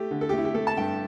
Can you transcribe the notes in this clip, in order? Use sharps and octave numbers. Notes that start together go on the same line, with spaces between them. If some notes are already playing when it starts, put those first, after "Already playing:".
Already playing: A3 G4
D3
A4
G4
A3
E4
G4
A3 A4
A5
G2 G5